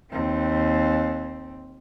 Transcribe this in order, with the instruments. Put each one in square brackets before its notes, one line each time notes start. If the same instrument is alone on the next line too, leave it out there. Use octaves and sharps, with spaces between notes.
[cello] D#2 C4